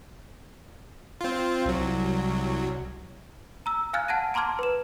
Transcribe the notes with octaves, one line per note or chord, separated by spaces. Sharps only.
C4 F4
C2 F#3
A#5 E6
F5 G#5 F6 F#6 G#6 A6
F#5 A5 G#6 A#6 D#7
A5 A#5 C6 D6 F6 G#6
B4 E7